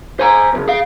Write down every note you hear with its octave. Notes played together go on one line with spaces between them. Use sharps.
C5 G#5 A#5
C#2 F#2 C#3
G#4 F5